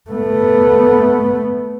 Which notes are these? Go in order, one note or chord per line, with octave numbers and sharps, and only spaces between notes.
A3 B3